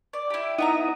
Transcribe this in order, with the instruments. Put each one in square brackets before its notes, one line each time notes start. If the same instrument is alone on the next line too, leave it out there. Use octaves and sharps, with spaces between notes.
[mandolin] D5
E4 G4
[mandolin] B3 E5 A#5 [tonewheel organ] D#4 E4 D#6